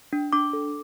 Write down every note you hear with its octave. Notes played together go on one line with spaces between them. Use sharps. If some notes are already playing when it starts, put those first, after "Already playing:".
D4
D4 D6
A4